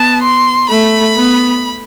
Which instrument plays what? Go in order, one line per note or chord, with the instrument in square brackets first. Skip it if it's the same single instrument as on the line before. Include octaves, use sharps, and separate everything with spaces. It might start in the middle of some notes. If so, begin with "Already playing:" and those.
Already playing: [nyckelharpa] B3 [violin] A5
[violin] C6
[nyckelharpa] A3 [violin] B5
[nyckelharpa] B3